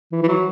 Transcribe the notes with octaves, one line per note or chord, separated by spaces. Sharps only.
E3
E3
F#3